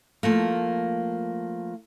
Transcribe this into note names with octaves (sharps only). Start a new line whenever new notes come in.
F3 A3 A#3